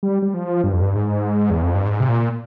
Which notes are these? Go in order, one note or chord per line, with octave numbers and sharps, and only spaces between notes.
G3
G3
F3
G2
F2
G2
G#2
E2
F2
G2
G#2
C3
A#2